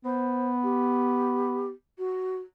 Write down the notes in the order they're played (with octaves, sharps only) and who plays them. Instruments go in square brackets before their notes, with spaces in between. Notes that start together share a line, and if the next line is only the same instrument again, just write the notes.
[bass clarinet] B3 [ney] C5
[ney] G4
F#4